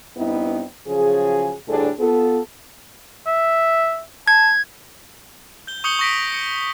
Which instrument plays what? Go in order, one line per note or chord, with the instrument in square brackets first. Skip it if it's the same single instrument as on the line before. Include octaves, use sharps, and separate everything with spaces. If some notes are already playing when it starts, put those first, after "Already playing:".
[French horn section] G2 B3 C4 D#4 E4
C#3 F3 F#3 G#4
D2 A2 G3 D4 G#4 A4
B3 F4 A4
[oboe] E5
[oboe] A5 [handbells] G#6
[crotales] G6 G7
C#6 D#6 G6 C#7 F#7 G7
C#6 D#6 A#6 B6 D7
C#7